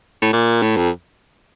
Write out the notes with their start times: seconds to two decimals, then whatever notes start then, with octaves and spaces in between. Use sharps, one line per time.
0.22 A2
0.33 A#2
0.62 A2
0.77 F2